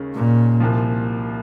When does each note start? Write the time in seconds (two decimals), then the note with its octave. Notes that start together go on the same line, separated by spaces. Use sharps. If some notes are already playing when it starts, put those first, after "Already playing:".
Already playing: D#2 C#3 G#3 C#4
0.14 A#2
0.60 C2 A#2 F3